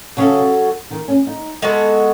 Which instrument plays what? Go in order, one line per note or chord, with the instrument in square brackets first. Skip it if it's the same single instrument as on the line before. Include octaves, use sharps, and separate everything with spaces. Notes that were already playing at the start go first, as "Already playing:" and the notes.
[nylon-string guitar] C#3 [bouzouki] F#3 C#4 F#4 A4
[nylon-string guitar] D#3
C#4
D#4
[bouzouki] G#3 B3 F#4 A4